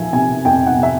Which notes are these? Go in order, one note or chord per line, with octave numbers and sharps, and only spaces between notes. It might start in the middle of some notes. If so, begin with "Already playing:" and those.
Already playing: F3 E5 G#5
C3 G#5
F2 G5
F#5
C3
E5